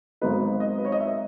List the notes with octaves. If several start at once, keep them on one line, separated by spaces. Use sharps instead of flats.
G#1 G#2 F#3 B3 D#4 B4
D#5
B4
C#5
D#5
E5